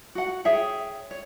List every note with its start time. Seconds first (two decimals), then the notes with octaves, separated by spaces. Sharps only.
0.15 F#4 F#5
0.45 G#4 C#5 E5 G5
1.11 C#5